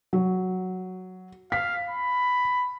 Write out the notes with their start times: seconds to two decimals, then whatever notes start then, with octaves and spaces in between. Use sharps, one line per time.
0.13 F#3
1.52 F5 B6
1.89 B5